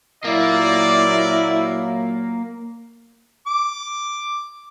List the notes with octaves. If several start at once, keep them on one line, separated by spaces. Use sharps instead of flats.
A#2 F#3 A#3 E4 D5
D6